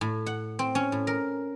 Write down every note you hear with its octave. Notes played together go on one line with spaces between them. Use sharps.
A2
F#5
C4
C#4
A2
A#4